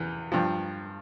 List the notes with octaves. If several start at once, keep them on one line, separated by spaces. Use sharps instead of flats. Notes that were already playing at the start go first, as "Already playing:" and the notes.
Already playing: E2 E3
G2 F3